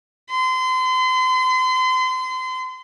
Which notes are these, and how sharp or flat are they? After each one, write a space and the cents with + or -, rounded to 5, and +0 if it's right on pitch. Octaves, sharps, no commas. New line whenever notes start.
C6 -35